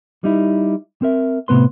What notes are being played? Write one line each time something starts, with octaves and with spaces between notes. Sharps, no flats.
G3 D#4 E4
C4 A#4 E5
A2 C3 B3 B4 C6